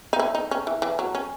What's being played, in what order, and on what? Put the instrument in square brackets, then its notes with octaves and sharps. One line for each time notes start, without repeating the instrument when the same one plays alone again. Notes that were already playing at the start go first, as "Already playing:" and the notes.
[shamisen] D#4
E4
D#4
C#4
E3
E3
F#3
C#4